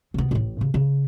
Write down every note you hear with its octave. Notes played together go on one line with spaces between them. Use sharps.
C3 B3
A1 A2
C#3
C#3